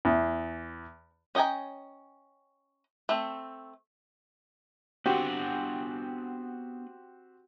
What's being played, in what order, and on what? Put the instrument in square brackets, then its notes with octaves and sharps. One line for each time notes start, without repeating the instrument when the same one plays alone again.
[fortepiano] E2
[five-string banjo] C#4 D#5 G5 G#5 A#5
A3 C4
[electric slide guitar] B3 D4 F#5 [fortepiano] C4 F#4 G4